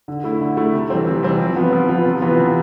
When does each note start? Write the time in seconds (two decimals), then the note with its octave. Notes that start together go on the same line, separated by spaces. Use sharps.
0.08 D3
0.24 A3 E4
0.41 D3
0.57 A3 E4
0.73 C3
0.90 E3 G3 C4
1.07 C3
1.23 E3 G3 C4
1.39 F3
1.56 B3 F4
1.72 F3
1.89 B3 F4
2.05 C3
2.21 E3 B3 F4
2.38 C3